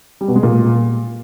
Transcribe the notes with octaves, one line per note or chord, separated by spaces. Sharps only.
G3
B2
G#3
A#2